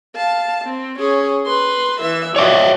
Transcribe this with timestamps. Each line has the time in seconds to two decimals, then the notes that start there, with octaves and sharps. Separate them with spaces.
0.16 F5 A5
0.64 C4
0.98 C#4 G#4
1.46 B4 C6
2.01 E3 E5
2.36 F3 F#3 C#5 D5 E5